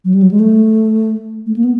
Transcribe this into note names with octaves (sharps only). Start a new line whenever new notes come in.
F#3
G3
F#3
G#3
A3
A3
A#3
B3